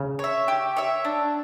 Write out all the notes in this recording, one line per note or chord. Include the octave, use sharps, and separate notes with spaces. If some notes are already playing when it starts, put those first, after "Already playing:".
Already playing: C#3
C#5 E5
G4
C#5 E5
D4